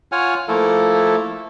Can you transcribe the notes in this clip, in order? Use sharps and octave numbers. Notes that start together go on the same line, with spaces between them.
F4 C#5 F#5 G#5 F6
F3 A3 A#3 E4 A4